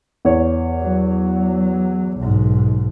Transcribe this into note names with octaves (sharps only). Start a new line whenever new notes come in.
E2 C#5
F#3
B1 G#2